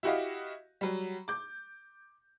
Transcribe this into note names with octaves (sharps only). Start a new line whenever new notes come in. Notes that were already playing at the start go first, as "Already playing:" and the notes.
E4 F#4 G4 D#5 F5
F#3 G3
D6 G6